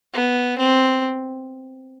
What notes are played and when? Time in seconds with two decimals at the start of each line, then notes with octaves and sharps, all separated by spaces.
0.14 B3
0.58 C4